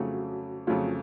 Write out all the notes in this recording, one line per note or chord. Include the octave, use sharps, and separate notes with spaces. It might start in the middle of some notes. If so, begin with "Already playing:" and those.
Already playing: F2 C#3 F#3 A3 F#4
F2 C#3 F#3 A3 F4